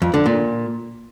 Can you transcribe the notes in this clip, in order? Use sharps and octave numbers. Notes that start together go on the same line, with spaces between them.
F2
D3
A#2